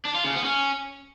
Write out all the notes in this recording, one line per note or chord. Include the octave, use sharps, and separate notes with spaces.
D4
F4
C#3
B3
C#4